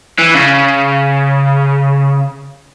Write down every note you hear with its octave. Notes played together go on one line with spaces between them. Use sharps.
E3
C#3